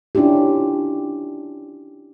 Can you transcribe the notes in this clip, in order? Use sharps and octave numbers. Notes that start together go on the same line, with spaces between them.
C#4 D4 E4 F4 G4